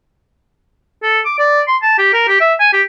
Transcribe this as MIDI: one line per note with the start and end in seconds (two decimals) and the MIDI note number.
1.03 1.20 69
1.25 1.39 86
1.39 1.62 74
1.68 1.77 84
1.82 1.95 81
1.98 2.12 67
2.13 2.27 70
2.28 2.38 67
2.41 2.54 76
2.60 2.72 80
2.73 2.82 67